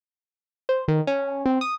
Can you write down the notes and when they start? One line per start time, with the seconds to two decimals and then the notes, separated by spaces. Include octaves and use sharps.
0.69 C5
0.88 D#3
1.07 C#4
1.46 C4
1.61 D#6